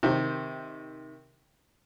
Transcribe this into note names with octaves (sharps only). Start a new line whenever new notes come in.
C3 D#3